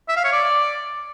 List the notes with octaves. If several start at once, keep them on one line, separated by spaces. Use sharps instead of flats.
E5
F5
C#5
D5